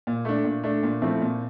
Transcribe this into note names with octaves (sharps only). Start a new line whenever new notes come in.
A#2
A3 D4
A#2
A3 D4
A#2
F3 A3 C4 E4
A#2